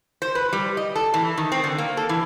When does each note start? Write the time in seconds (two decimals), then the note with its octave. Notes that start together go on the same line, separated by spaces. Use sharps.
0.22 C5
0.35 B4
0.53 G3
0.77 D#5
0.95 A4
1.14 E3
1.38 D#3
1.52 C4
1.64 D3
1.78 A#3
1.97 A4
2.09 E3